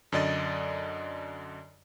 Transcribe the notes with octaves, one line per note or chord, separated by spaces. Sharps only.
F#2 D3 D5 D#5 A6